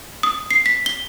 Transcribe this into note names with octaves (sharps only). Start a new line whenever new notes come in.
D#6
C7
B6
G7